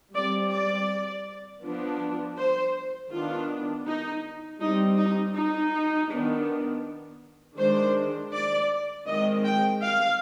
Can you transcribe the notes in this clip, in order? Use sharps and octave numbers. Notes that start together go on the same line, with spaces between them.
G3 C4 D5
D5
F3 B3 D4
C5
D#3 B3 D4 F4
D#4
G3 C4 D#4
D#4
D#4
D#3 B3 D4
D#3 G#3 D4 C5
D5
D#3 G#3 C4 D#5
G5
F5